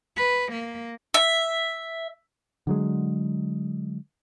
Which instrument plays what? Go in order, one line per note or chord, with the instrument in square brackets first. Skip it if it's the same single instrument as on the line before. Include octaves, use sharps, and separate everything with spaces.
[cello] B4
A#3
[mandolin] E5
[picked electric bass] D3 F#3 G#3